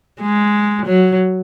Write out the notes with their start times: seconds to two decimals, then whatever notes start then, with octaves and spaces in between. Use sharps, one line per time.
0.21 G#3
0.86 F#3